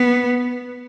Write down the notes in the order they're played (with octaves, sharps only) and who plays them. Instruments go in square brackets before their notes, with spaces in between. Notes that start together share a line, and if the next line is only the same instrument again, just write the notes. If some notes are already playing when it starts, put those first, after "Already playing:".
Already playing: [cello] B3